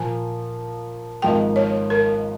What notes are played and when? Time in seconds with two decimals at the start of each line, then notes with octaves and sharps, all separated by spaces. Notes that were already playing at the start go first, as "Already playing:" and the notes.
Already playing: A#2 F3 A#3 G#5
1.22 G#1 G#2 F3 A#3 G5
1.56 C#5
1.90 A#4